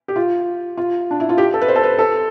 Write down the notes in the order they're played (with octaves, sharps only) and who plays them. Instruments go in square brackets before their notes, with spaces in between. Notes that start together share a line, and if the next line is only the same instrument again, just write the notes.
[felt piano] G4
F4
F4
D4
E4
F4
G4
A4
B4
C5
A4
B4
A4